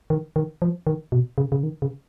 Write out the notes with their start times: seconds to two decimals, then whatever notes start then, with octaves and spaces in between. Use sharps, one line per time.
0.10 D#3
0.36 D#3
0.62 F3
0.87 D#3
1.12 B2
1.38 C#3
1.52 C#3
1.63 D#3
1.82 C#3